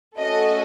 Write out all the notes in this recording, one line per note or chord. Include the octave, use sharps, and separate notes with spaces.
A3 C#4 F#4 A4 D#5